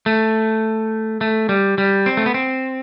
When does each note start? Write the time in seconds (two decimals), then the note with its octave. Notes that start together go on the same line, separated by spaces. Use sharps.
0.06 A3
1.21 A3
1.49 G3
1.78 G3
2.06 C4
2.17 A3
2.26 B3
2.34 C4